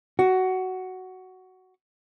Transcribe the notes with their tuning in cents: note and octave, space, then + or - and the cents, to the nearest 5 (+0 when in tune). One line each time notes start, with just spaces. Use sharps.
F#4 +10